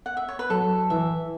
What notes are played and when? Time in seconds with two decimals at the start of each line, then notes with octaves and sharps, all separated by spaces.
0.06 F#5
0.17 E5
0.28 C#5
0.39 B4
0.50 F#3 A4
0.90 E3 E5